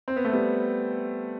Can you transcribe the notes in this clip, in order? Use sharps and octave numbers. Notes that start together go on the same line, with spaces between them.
C4
B3
A3
G3 B3